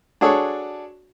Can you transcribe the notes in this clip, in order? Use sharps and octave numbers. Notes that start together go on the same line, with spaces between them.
D4 F#4 G#4 A4 C#5